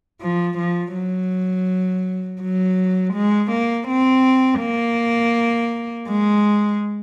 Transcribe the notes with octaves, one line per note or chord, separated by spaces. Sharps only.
F3
F3
F#3
F#3
G#3
A#3
C4
A#3
G#3